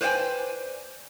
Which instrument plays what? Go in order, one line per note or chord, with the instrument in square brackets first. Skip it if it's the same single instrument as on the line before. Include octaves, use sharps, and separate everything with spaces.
[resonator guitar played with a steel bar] B4 C5 D5 F5 G5 G#5